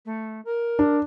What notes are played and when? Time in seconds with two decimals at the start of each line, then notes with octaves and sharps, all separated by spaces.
0.05 A3
0.44 A#4
0.79 D4